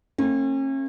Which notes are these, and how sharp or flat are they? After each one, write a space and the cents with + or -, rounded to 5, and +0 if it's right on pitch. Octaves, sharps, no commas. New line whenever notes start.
A3 +45 C#4 -40